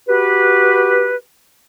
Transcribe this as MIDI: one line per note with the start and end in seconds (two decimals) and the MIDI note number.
0.08 1.16 66
0.08 1.16 67
0.08 1.16 71